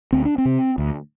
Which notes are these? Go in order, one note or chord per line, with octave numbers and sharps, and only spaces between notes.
D2 C4
D4
C4
C3
D2